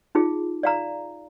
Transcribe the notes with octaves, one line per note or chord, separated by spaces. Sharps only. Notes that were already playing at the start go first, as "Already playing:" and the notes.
D#4 F4 G#4
D5 F5 A#5